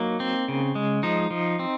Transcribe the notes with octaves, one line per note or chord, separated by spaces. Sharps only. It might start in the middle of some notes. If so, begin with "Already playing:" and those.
Already playing: F#3 A#3 D#4
C4
C#3
G#3
F3 D#4
F3
C4